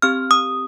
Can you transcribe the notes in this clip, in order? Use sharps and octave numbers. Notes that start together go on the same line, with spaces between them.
C4 G4 F6
D#6